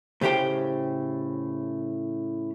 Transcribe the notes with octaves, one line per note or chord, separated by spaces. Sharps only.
A2 C#3 G4 C5 G5